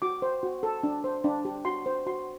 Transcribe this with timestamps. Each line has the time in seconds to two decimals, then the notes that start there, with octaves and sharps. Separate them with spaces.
0.02 F#4 D6
0.22 C5
0.43 F#4
0.63 A4
0.83 D4
1.04 C5
1.24 D4
1.45 G4
1.65 F#4 C6
1.86 C5
2.07 F#4 C6